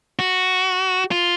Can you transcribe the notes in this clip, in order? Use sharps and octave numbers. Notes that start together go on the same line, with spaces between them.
F#4
F4